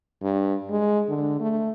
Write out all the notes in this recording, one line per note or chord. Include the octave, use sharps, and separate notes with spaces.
G2
G#3
D3
A3